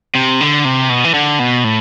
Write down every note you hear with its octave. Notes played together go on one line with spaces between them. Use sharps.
C3
D3
C3
B2
E3
D3
B2
A2